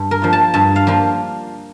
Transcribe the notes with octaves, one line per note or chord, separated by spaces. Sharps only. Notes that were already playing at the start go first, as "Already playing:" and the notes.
Already playing: G2
A#4
F3 A#3 D4 F4
A5
G2 A5
F5
F3 A#3 D4 F4